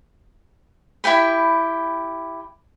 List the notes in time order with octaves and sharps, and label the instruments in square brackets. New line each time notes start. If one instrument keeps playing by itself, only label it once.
[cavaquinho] E4 G4 G5 B5